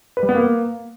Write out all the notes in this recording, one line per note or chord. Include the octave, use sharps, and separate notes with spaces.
B4
G3
B3
A#3